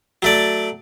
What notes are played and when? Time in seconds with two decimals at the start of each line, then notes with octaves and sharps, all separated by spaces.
0.22 F#3 A3 D5